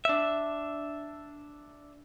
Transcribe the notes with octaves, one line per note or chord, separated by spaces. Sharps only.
D4 E5